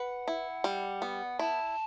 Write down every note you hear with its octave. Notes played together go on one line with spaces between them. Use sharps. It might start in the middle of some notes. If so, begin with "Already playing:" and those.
Already playing: B4 F#5
E4
G3
B3
E4 A5